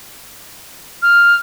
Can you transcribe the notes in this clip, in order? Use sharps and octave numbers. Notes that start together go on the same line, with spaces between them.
F6